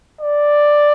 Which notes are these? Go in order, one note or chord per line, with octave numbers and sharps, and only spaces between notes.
D5